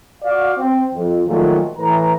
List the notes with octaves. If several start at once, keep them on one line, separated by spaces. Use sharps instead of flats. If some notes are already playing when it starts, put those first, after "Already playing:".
F#4 D5 F5
C4
F2
A#2 D#3 F3 F#3 G#3 A3
A2 E3 B4 A#5